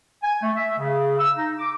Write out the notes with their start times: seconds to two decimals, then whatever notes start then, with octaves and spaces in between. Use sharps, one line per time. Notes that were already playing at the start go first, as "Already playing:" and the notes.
0.23 G#5
0.42 A3
0.56 E5
0.78 C#3
1.19 E6
1.36 D#4
1.59 D6